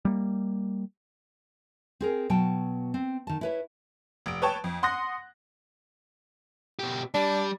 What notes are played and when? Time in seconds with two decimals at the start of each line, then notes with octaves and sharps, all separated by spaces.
0.05 G3 A#3
2.01 C4 G#4 A#4
2.30 B2 F#3 G5 A5
2.94 C4
3.27 D#3 A5
3.41 E4 B4 C#5
4.26 F1 D7
4.42 B4 C#5 G5 A5 C#6
4.64 F2
4.83 F#5 C6 D#6 F#6 A#6
6.79 B2 G4
7.14 G3 D4